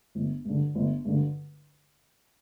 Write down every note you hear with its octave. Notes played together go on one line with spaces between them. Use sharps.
G1
G2 D3
G1
G2 D3